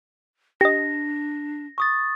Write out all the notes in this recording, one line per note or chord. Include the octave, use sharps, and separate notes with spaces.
D4 G4 D#5 A#6
C#6 D#6 A6